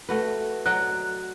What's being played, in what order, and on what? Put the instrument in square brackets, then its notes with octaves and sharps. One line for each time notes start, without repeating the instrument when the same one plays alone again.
[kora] A3 F#4 B4
[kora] F#3 D5 D#5 [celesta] F#6